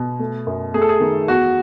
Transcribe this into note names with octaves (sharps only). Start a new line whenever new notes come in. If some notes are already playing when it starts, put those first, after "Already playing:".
Already playing: B2
A3
F#2
A3 G#4
A4
G#4
D#3
E2 F#4